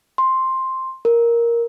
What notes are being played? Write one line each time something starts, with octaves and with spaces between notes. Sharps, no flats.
C6
A#4